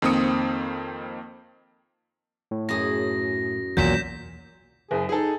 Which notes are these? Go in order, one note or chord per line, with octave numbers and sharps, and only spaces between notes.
F2 D#3 A#3 C4 D#6 C#7
A2
F#2 G#4 A#6
B1 E2 A#2 D#3 F#3 G6 B6 E7
F#1 G#4
D#4 G#4 A4